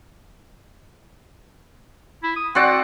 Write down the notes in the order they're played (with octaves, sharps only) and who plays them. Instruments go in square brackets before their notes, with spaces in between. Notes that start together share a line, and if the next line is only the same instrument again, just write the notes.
[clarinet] E4
D#6
[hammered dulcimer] C4 F#4 D5 [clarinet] F#5